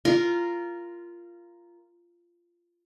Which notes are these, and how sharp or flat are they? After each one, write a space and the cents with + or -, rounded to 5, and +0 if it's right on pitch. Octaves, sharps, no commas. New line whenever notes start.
F4 -15 A#4 +0